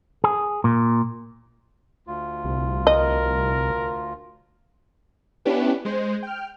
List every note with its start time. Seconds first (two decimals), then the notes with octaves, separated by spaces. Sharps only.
0.24 G#4
0.64 A#2
2.07 D2 F4
2.45 C2
2.87 A#4 D#5
5.45 B3 C#4 D4 E4 G4 B4
5.85 G#3 C5
6.23 G5 F6